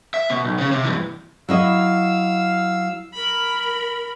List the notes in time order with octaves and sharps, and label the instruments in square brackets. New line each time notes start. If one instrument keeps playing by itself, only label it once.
[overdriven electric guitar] E5
B2
B1
C#3 C#4
C3
G2 E3
[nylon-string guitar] F#3 E4 D#5 [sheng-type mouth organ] F5 E6
[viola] A#4 B5